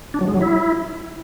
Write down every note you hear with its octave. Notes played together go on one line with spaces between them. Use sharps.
D4
F#3
G#3
F#3
E4